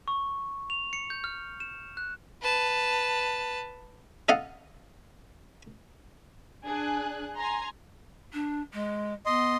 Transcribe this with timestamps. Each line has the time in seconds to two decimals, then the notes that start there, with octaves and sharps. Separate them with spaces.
0.08 C#6
0.70 F7
0.93 C#7
1.10 G6
1.24 F6
1.60 E7
1.97 F#6
2.42 B4 A5
4.29 A4 D#5 F5 F#5
6.65 D4 G#4 G#5 F#6
7.37 G#5 A#5 C6
8.33 D4
8.73 G#3
9.26 B3 D#5 C6